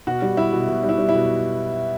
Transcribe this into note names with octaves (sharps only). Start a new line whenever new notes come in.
B2 F#4
G3
G3 E4
B2
B2
G3
E4
G3
E4
B2